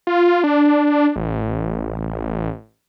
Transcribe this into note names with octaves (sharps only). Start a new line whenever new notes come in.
F4
D4
A1